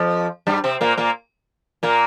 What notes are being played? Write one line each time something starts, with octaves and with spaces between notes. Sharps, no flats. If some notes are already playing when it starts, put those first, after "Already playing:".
Already playing: F2 F3
G2 G3
C3 C4
A#2 A#3
A#2 A#3
A#2 A#3